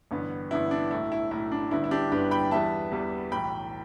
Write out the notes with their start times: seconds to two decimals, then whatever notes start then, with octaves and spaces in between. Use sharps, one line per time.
0.11 A1 G2 D3 B3
0.51 A1 G2 D3 B3 E4
0.71 D4
0.91 B1 A2 A3 E4
1.12 E4
1.31 B1 A2 A3 E4
1.52 D4
1.71 G1 G2 D3 B3 E4
1.84 E4
1.91 D4 G4
2.11 G1 G2 D3 B3 G4 B4
2.31 G5 B5
2.51 E2 E3 G3 B3 E5 A5
2.91 E2 E3 G3 B3
3.32 B1 A2 E3 G5 B5